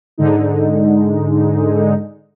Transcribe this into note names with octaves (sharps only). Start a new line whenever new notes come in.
G#2 D3 G#3 D#4